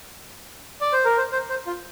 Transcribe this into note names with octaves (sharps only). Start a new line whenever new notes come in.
D5
C5
A#4
C5
C5
C5
F4